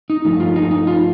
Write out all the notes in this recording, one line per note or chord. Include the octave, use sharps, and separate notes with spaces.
D#4
G2 F3 A3 D#4
F4
D#4
D#4
F4